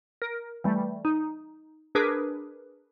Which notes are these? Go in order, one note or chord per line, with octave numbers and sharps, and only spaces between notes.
A#4
E3 G3 A3
D#4
D4 G#4 A#4 B4 D6